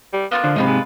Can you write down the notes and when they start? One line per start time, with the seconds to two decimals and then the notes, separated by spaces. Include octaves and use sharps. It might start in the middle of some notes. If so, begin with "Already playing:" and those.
0.13 G3
0.31 A#3 B3 F4 F#6
0.44 D3 F3
0.56 G#2 C3 D#4 F4 B4
0.67 G#3